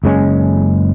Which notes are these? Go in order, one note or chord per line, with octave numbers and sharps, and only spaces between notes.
F#1 G#3 C#4